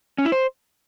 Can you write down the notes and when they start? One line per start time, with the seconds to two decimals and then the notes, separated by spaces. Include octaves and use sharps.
0.18 C#4
0.25 E4
0.32 C5